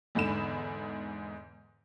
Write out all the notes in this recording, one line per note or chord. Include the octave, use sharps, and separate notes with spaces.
E2 G#2 D3 B5 E7